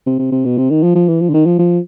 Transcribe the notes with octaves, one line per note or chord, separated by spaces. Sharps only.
C3
C3
C3
B2
C3
D#3
F3
F3
E3
F3
D3
D#3
F3
F3